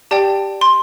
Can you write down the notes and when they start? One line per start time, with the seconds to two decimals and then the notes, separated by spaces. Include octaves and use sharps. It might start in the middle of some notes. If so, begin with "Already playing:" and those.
0.11 G4 D5 G5 A5
0.61 C6